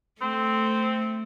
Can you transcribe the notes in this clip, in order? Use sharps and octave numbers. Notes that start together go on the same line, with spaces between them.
A3 C4